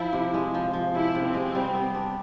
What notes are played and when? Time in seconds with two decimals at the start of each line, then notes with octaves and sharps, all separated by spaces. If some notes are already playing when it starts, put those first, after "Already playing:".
Already playing: F3 E4
0.13 C3
0.34 G#3
0.54 F3
0.73 F3
0.94 C3 E4
1.15 C3
1.25 C4
1.34 G#3
1.55 G3
1.75 B3
1.94 D4